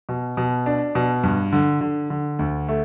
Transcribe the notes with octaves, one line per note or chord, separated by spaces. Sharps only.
B2
B2
D4
B2
G2
D3
D3
D3
D2
A3